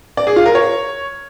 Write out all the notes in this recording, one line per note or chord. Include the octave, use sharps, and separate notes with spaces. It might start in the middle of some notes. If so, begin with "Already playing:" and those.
D5
G#4
F4
A#4
C#5